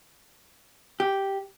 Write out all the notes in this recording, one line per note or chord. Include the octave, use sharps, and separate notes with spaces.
G4